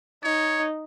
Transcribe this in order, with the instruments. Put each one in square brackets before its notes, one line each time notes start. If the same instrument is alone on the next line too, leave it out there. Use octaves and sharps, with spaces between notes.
[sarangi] D#4 [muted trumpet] C#5